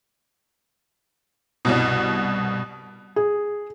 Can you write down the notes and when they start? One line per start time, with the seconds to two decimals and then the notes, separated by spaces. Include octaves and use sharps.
1.65 C2 G2 B2
3.16 G#4